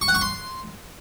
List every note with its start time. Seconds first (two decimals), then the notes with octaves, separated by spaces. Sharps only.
0.02 C#6
0.08 F#5
0.15 C#6
0.21 C6